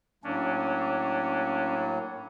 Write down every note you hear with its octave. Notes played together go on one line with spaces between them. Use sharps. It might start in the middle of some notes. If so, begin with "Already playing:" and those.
A2 F#3 A#3 C#4 D4